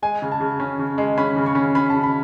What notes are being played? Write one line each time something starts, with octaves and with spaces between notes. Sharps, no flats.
G#3 G#5
C#3
A5
C#3
C#4
C#3
G#3
C#4 B5
C#3
C#6
C#4
C#4 B5
C#3 A5
B5